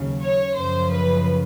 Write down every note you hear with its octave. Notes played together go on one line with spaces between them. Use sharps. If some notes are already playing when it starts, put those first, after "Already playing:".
Already playing: D#2 C#3 F#3
C#5
F#2 C#3 F3 C5
B4